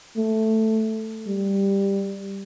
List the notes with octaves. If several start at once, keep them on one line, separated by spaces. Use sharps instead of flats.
A3
G3